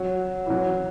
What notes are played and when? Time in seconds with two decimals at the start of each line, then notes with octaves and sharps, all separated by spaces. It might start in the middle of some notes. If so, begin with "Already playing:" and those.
Already playing: F#3
0.46 E3
0.50 F#3